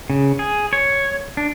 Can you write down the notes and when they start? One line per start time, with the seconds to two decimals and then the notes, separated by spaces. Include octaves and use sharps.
0.10 C#3
0.39 G#4
0.73 C#5
1.37 D4